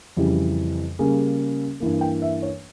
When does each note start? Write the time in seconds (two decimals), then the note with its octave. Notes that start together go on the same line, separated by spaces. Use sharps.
0.16 F2 C#3 E3 G3 G4
0.99 C#3 G3 A#3 C#4 G#4
1.80 G2 E3 A#3
2.01 G5
2.22 E5
2.42 C#5